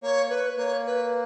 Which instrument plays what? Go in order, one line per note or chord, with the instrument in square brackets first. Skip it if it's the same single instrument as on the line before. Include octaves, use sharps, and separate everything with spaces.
[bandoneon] A#3 [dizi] C#5
[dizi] B4
[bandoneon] A#3 [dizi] C#5
[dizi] B4